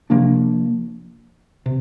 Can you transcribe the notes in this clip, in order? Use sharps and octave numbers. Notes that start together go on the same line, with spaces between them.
C3 F3 A#3 D4
C3